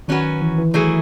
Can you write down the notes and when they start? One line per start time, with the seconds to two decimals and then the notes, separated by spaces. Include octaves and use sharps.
0.08 D#3 F#3 C#4 F#4 B4
0.42 E3
0.58 E3
0.74 F#3 A3 E4 G#4